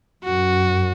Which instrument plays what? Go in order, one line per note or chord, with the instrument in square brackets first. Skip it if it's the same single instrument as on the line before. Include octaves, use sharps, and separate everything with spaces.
[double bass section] F#2 [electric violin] F#4